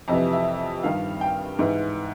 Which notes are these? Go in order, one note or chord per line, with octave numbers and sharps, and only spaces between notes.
F2 C3 E3 D#5
E5
G2 D#3 F5
G5
G#2 E3